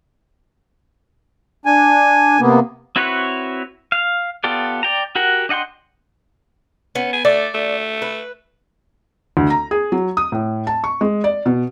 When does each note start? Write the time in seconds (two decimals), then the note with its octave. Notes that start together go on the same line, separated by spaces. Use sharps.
1.66 D4 G#5
2.40 C3 A#3 B3
2.96 C4 E4 F#4 B4 C#5
3.92 F5
4.44 B3 F4 G4 A4 D5
4.83 D5 G5 A#5
5.16 F#4 G4 A#4 F#5
5.49 D4 D#5 F#5 G5 C6
6.95 B3 C#4
7.13 G#5
7.25 A3 D5
7.54 A3
8.02 B4
9.37 D2
9.50 A#5
9.71 G#4
9.92 F#3
10.17 D#6
10.32 A2
10.67 A5
10.84 C#6
11.01 G#3
11.24 D5
11.46 B2